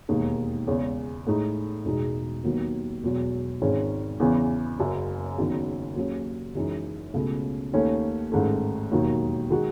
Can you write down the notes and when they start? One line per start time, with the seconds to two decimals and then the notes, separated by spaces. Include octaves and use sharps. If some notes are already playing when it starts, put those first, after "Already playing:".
0.09 E1 D#2 D#3 G#3 D#4
0.67 E2 C#3 G#3 C#4
1.27 A2 G#3 D#4
1.85 E1 E2 B2 G#3 D#4
2.44 D#2 D#3 F#3 B3
3.03 E1 E2 B2 F#3
3.61 G#1 G#2 D#3 G#3 C#4
4.20 E2 C#3 E3 B3
4.79 F#1 F#2 C#3
5.38 F#1 E2 D#3 F#3
5.96 D#2 C#3 F#3 C#4
6.55 F#1 F#2 E3 G#3 D#4
7.14 C#2 B2 A3
7.73 D#2 D#3 A3 C#4
8.32 A1 G#2 D#3 A3
8.92 E1 D#2 D#3 F#3
9.50 D#3 G#3 D#4 F#4